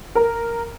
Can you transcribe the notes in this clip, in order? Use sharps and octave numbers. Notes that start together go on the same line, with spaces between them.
A#4